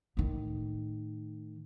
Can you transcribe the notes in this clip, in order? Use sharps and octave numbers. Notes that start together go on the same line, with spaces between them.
A2 D#3